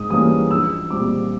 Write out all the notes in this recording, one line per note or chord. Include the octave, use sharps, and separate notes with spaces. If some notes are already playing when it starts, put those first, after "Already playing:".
Already playing: G#2 D#6
E3 G3 A#3 C#4 D#6
A#1 E6
A#2 G3 C4 D6